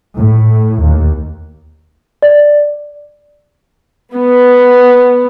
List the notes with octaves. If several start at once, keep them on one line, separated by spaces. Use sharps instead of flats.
A2
D#2
D5
B3